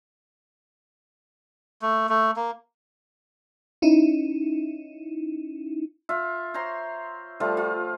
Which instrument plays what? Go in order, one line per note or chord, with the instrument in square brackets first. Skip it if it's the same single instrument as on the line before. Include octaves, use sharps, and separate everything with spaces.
[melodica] A3
A3
A#3
[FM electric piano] C#4 D#4 E4
[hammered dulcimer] F4 E5
C5 C#5 A#5 C6
F3 G3 A3 F4
F4